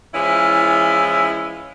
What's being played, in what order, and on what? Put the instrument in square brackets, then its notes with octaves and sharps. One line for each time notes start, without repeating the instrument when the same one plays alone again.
[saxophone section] E3 F3 G#3 C#4 E4 F4